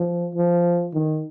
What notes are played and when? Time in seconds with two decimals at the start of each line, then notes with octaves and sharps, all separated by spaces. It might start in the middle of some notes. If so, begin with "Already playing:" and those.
Already playing: F3
0.35 F3
0.94 D#3